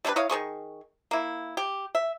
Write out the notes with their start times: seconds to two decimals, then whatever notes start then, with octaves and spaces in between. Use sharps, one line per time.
0.05 G3 A3 D4 B4
0.16 E4 C#5 D#5 F5
0.30 D#3 B3 G#4 C#6
1.11 A#3 E4
1.57 G4
1.95 E5